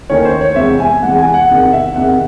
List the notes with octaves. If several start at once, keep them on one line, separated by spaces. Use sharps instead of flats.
D#2 D#3 A3 C#4 C#5
C5
C#5
E2 C3 E3 G#3 E5
G#5
E2 C3 E3 G#3 F#5
G#5
F#5
E2 C3 D#3 F#5
E5
E2 C3 D#3 F#5